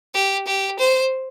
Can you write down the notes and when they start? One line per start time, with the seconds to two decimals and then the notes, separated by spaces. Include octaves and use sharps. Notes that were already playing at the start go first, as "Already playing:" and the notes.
0.14 G4
0.47 G4
0.79 C5